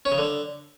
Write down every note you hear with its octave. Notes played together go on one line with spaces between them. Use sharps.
C#4
C#3
D3